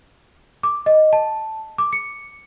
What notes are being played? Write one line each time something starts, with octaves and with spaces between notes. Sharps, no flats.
D6
D#5
A5
D6
C#7